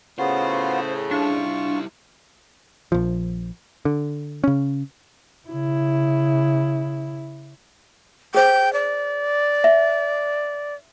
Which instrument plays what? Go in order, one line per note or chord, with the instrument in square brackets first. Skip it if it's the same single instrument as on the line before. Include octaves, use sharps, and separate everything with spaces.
[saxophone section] A2 C#3 [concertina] B3 F4 F#4 [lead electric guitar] C5
[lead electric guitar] G3 E4 [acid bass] D4 [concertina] F4 C#6
[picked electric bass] A#1 F3
D3
C#3 C#4
[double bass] C#3 E4
[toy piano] G#4 C5 [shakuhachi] G5
[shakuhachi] D5
[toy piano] E5